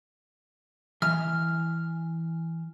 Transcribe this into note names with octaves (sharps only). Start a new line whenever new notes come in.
E3 E5 F6